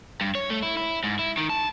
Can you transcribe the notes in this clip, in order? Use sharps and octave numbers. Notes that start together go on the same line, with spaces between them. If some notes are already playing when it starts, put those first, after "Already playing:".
G2
C#5
A3
E4
E4
G#2
E4
D#3
A5